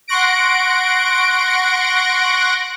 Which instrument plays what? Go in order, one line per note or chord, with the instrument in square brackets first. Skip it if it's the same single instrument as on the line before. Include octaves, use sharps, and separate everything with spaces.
[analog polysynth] F#5 C6 C#6 F#6 A#6 D7